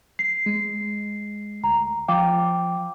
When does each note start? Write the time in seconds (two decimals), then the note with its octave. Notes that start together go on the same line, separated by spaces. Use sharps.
0.19 C7
0.46 G#3
1.64 D2 A#5
2.08 F3 F5 G5 D6